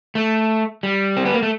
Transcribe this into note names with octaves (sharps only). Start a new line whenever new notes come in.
A3
G3
C4
B3
A#3
A3